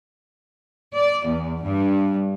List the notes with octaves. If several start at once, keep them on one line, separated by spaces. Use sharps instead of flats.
D5
E2
G2